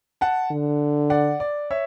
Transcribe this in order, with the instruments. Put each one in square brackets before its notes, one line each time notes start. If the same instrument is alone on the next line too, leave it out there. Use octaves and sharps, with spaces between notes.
[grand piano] F#5 A5
[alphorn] D3
[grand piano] D5 F#5
D5
C#5 E5